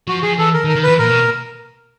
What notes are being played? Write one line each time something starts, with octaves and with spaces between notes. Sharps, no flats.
F3 F#4
F3 G#4
E3 A4
A#4
D#3
A#4
D#3
E3 B4
A#2 A#4
B2